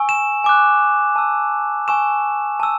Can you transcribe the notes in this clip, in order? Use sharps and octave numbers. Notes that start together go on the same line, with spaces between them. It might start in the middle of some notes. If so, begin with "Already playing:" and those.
Already playing: G#5 C#6 E6
E7
G#5 D6 F#6
A5 E6
G#5 C#6 E6 E7
A5 E6